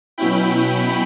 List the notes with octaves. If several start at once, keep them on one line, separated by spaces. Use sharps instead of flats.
B2 F#3 C#4 E4 G5 B5